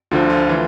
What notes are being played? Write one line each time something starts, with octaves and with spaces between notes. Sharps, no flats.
D2 D3 F3 F4
F4
E3